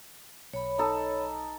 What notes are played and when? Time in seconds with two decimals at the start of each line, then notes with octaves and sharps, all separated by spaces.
0.53 B1 C#5 B5
0.78 D#4 A4 D#5